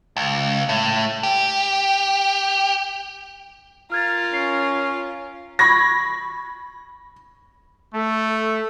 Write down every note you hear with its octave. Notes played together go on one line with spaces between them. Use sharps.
C#2
A2
G4
F4 A#4 F6 G#6 A6
C#4 C7
B5 C#6 G#6 A#6
A3 A4